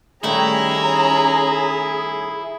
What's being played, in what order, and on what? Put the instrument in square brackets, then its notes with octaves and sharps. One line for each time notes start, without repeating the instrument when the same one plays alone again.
[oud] D#3 G3 A3 [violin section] C#4 A#5 [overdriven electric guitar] E4 [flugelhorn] G#4